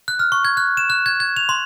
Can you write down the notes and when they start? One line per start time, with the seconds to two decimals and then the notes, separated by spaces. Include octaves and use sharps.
0.08 F#6
0.19 F6
0.32 C#6
0.45 G#6
0.57 F#6
0.77 E7
0.90 F#6
1.06 G#6
1.20 G#6
1.37 F7
1.49 C6